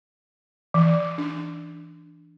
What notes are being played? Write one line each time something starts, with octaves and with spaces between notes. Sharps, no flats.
E3
D4